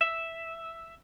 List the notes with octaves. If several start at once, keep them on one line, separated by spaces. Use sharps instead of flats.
E5